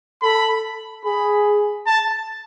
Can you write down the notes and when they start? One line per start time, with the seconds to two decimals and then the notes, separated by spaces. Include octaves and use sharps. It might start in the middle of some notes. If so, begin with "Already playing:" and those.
0.22 A4 B5
1.04 G#4 B5
1.86 A5